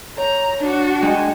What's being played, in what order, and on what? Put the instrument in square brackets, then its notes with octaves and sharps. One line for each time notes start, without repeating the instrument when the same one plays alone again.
[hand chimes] C#5 [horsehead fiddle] A#5
[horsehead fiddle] D4 F#4
[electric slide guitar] G#3 [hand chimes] G5